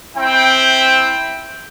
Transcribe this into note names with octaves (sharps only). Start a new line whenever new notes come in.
C4 E4 G5